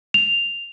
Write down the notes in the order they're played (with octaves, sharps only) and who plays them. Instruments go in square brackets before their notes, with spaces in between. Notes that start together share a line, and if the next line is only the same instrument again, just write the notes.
[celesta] F7